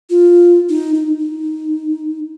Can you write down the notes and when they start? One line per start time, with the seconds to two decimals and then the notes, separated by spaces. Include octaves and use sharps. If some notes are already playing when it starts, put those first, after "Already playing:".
0.10 F4
0.69 D#4
0.94 D#4
1.19 D#4